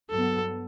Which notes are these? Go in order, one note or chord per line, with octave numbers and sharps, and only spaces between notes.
G2 F#3 B3 A4